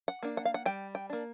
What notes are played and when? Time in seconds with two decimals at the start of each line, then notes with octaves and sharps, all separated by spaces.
0.08 F#5
0.23 A#3 D4
0.37 F#5
0.45 F5
0.54 F#5
0.66 G3 G5
0.95 G5
1.10 A#3 D4